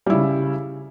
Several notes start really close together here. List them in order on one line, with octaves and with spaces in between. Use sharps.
G3 E4 C#3